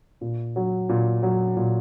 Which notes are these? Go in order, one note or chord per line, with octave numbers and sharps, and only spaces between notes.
A#2
F#3
A#2
F#3
A#2